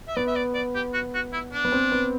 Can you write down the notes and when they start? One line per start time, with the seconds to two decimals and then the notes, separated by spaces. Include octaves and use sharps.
0.08 E5
0.16 B3 D5
0.27 E5
0.36 D5
0.55 D5
0.75 G4
0.93 F#4
1.14 F#4
1.33 E4
1.53 D4
1.65 B3
1.72 C4
1.92 B3